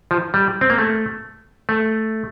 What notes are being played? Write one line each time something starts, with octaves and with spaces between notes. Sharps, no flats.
F3
G3
C4
A#3
A3
A3